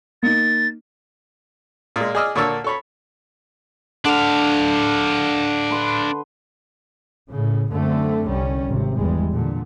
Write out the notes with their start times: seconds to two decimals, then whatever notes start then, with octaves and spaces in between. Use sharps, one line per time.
0.23 A#3 D#4 A6
1.96 A#2 G#3
2.15 G#4 D5 D#5 E6 F6
2.35 A#2 D3 A#3 C#5 A5 E6
2.64 A4 C#5 B5
4.05 D3 D4 F5
5.71 B4 C6
7.29 A2 C#3
7.71 F#2 D3 A3 C4
8.26 C2 G3 C#4
8.67 G#1 C3
8.95 E2 G3 G#3
9.32 A#2 D3